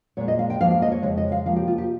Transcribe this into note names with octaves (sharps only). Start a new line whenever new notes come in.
A#2 G#3 C#5
D#5
F5
G5
G#2 F3 A#3 F5
F5
D#5
C#5
F2 C#3 G#3 C#5
D#5
F5
C3 F3 A#3 F5
G4
F4
G4